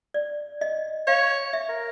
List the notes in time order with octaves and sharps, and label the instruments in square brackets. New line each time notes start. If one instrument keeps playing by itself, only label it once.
[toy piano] D5
D#5
[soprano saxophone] C#5 [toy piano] F5
[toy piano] E5
[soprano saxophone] A#4